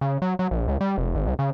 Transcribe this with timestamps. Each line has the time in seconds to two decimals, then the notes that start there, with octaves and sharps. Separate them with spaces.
0.01 C#3
0.22 F#3
0.39 F#3
0.51 A#1
0.68 C#2
0.81 G3
0.98 F1
1.15 G#1
1.27 C2
1.39 C#3